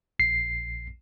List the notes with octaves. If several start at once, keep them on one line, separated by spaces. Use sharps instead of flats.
A#1 C7